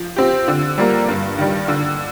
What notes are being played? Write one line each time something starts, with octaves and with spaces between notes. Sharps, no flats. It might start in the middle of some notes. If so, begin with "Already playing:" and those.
Already playing: F3
C4 G4
D3
G3 A#3 F4 A#4
G2
D#3 G3
D3